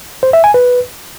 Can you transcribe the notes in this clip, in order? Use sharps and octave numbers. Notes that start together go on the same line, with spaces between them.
C5
E5
G#5
B4